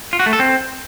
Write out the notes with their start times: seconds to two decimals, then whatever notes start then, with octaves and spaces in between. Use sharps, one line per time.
0.13 F4
0.20 F#4
0.26 A3
0.33 A4
0.39 C4